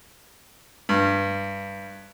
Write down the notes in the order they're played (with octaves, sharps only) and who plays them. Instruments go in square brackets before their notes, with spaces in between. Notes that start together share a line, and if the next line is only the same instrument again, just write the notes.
[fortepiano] G2